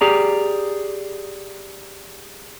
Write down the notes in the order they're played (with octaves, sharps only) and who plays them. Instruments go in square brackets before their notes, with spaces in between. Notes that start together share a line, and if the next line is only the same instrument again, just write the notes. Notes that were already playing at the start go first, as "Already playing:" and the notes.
[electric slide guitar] G4 G#4 D5 A#5